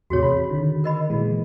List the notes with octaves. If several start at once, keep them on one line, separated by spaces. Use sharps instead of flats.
E2 A2 C3 F#4 G#4 C#5
B5
D3 D#3
A#4 D#5 B5
A#2 E3 G#3